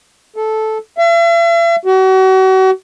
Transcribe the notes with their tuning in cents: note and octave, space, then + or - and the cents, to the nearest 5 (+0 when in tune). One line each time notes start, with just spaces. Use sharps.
A4 -10
E5 +45
F#4 +40